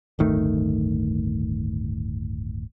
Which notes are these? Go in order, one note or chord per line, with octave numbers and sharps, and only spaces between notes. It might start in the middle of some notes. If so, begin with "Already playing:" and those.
D1 G1 D#3 A3